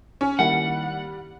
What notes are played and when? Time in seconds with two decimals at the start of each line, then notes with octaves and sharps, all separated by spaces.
0.21 C#4
0.39 D#3 G3 A#3 E4 F#5